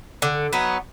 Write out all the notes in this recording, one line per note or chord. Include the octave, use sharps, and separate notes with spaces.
D3
F#3 B3 D#4